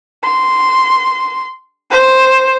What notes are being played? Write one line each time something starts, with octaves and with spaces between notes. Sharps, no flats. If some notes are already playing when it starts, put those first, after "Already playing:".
C6
C5